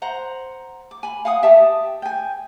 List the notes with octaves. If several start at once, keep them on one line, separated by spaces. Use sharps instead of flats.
C5 F#5 A#5
D6
G#5 B5
F5 F#5 G#5 D#6
G4 E5 A5 D#6
G5 G#5